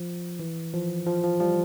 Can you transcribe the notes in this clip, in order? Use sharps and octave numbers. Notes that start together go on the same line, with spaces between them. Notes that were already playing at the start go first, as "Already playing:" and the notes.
Already playing: F3
E3
F3
F3
F3
F3 G3